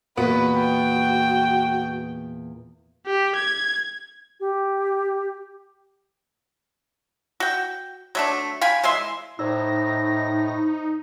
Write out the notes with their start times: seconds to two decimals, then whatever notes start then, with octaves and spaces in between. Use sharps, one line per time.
0.17 E2 A#2 B3 F#4 B4
0.58 G5
3.07 G4
3.35 G#6
4.40 G4
7.40 F#4 G5
8.15 F#3 A3 D4
8.61 F5 G5 G#5 B5
8.83 E3 G#3 E5 C6
9.39 A2 D#4 C5 D5 E6 A#6